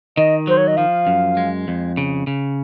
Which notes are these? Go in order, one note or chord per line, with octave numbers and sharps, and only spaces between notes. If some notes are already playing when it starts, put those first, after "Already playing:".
D#3 D#5
F#3 C5
C#5
D#5
F3 F5
F#2
G#3
F2
C#3
C#3